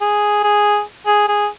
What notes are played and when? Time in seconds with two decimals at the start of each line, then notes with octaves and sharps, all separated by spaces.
0.01 G#4
0.44 G#4
1.06 G#4
1.28 G#4